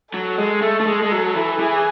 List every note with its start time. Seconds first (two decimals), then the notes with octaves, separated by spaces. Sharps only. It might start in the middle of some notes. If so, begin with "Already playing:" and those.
0.14 F#3 A4
0.39 G#3
0.62 A3
0.80 A3
0.87 G#3
1.02 G#3
1.12 F#3
1.36 E3
1.60 E3 G#4